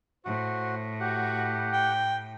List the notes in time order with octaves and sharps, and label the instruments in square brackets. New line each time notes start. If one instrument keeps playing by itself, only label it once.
[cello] A2 [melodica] F#4 [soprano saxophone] C5
[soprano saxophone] F#4 [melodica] G4 F#5
[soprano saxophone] G5